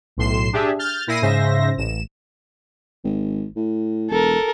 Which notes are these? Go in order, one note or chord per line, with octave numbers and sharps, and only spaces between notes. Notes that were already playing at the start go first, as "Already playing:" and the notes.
B1 A2 C6 C7 E7
D4 G4 G#4 E5
F6 G6 A6
A#2 E4 A#6 C7 D#7
G#2 C#3 C5 E5 A#6
A1 E7
G#1
A2
E1 A4 A#4